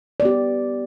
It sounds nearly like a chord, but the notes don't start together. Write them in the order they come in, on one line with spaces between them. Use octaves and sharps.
D5 B3 G4